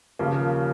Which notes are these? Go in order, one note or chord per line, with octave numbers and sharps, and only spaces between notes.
D#2 C#3 F3 A#3